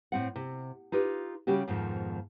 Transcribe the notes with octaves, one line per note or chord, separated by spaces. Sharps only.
A2 C4 F#5
C3
D#4 F4 G4 B4
C#3 G3 C#4 F#4 G4
F2 G#2 B2 D#3 F3